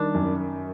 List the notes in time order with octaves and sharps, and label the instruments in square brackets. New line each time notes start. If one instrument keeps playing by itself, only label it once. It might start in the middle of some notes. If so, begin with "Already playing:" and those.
Already playing: [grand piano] D#3 G3 [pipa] D4
[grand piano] F#2